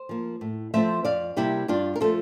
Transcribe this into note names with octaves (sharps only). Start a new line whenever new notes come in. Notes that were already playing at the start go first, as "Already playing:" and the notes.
Already playing: C5
F3 A#3
A2
F3 A3 C4 C5 E5
F2 D5 F5
C3 G3 A#3 E4 G4
G2 D4 F4
A#4
F3 A3 F4 A4